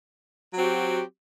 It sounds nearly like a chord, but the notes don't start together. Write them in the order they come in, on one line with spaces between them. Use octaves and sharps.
F#3 C4 F#4 G4